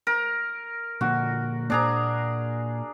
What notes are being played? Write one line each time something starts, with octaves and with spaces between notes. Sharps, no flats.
A#4
A#2 D3 F3 F#4
A#2 A#3 D4 G#4 A#5